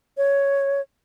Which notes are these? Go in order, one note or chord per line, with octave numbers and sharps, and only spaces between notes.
C#5